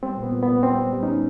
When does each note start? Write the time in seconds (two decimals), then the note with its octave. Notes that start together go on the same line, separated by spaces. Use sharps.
0.03 G3 C4
0.17 A#2
0.23 B3
0.32 A#2
0.42 B3
0.48 A#2
0.63 G3 C4
0.78 G3
0.93 G3
1.03 C#4 D#4
1.08 G3